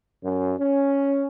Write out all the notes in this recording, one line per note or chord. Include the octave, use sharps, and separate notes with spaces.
F#2
C#4